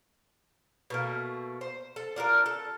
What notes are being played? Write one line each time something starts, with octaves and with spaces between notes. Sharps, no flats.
B2 A3 A#3
C5
A4
D4 F4 F#4 A#4
A4